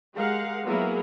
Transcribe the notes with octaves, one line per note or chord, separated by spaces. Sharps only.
G#3 G4 A#4 F5 F#5
F#3 A#3 B3 E4 G#4 A#4